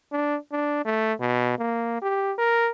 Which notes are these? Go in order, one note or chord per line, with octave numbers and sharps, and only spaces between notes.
D4
D4
A3
B2
A#3
G4
A#4